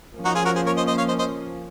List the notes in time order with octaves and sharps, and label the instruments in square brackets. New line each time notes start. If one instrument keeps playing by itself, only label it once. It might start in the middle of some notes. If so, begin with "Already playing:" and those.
[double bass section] F3 A#3 C#4
[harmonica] D#4 F#4
F4 G#4
F#4 A#4
G#4 C5
A#4 C#5
C5 D#5
C5 D#5
C#5 F5
C5 D#5
C5 D#5